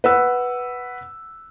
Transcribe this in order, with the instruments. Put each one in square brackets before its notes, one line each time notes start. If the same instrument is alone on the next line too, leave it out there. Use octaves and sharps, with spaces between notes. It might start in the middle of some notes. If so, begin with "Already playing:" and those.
[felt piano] B4 F#5 E6